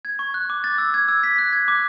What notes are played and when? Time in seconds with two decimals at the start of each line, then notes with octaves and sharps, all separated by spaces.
0.05 G#6
0.19 C#6
0.34 F#6
0.50 D6
0.64 A6
0.78 E6
0.94 G#6
1.08 E6
1.23 B6
1.38 F#6
1.53 G#6
1.68 D6